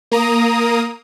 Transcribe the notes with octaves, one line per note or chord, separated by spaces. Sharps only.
A#3 A#5 D#6